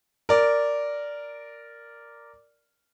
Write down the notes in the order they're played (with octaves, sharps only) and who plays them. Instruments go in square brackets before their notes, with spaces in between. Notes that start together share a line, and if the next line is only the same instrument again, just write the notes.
[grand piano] A#4 D5